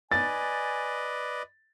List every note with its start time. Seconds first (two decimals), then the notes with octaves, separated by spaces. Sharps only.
0.11 B4 D5 D#5 G#5 A6